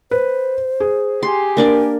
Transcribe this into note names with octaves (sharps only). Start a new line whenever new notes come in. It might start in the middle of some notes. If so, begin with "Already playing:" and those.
B4 C5
G#4
G4 G#5 C6
A#3 D4 A#4 D5